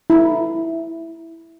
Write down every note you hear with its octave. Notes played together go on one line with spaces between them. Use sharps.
E4